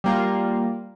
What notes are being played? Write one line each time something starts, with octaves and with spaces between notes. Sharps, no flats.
G3 A#3 F4